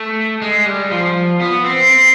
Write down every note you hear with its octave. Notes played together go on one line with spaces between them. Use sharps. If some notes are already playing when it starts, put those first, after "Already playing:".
Already playing: A3
G#3
G3
F3
B3
C4
C4